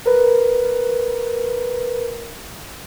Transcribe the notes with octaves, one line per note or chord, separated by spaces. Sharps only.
A#4 B4